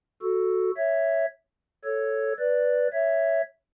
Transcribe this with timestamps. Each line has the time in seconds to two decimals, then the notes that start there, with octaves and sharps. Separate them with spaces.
0.22 F#4 A4
0.77 C#5 E5
1.85 A4 C#5
2.39 B4 D5
2.93 C#5 E5